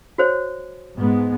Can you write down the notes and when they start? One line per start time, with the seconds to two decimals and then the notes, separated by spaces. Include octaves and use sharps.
0.18 F#4 C5 C#5
0.98 G#2 G#3 B3